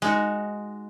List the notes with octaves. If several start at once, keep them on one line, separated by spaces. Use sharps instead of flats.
G#3 D#4 F#4